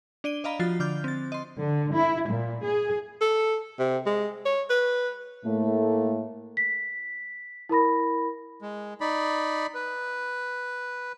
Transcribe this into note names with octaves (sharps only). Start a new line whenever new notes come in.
D4 D5 D#7 G7
D5 D#5 F5 A#5 B5
F3 F4 F#4 A6 C7
D3 D6 F6 G6
C4 A6
D#5 C6
D3
E4
A#2
G#4
A4
C3
G#3
C#5
B4
A2 A3 A#3
B6
E4 A#4 B5 A#6
G#3
D#4 D5 B5
B4